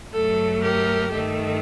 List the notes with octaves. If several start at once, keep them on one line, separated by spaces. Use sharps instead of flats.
G2 F#3 A3 A4
G4 A#4
G2 D#3 A3 A4